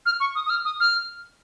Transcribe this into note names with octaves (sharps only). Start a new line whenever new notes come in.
F6
C#6
D#6
D#6
F6
D#6
F6